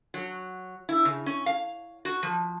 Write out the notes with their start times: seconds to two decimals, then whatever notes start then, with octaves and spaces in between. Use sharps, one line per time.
0.14 F#3
0.89 E4
1.05 C#3
1.26 C#4
1.46 F5
2.05 F#4
2.23 F3